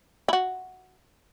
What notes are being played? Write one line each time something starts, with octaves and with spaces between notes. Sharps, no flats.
E4
F#4